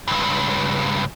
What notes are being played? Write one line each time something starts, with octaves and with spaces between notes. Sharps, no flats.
C#2 G2